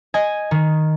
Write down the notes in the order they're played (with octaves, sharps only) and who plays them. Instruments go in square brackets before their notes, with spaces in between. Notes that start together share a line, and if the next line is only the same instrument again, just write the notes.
[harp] D#5 G#5 G#6
D#3